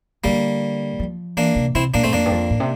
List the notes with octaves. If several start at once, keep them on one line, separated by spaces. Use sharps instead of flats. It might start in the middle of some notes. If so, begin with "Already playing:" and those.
D3 G3 A#3
F3
E3 A#3 D4
C3
C3 C4 E4
A#2 A#3 D4
G2 A3 C4
F2 A#3 D4
G2
F2
A2
C3